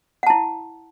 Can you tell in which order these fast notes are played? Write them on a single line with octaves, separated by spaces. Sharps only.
F#5 A5 E4